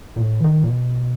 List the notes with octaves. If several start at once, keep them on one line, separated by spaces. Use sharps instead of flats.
A#2
A2
E3
D#3
A#2
B2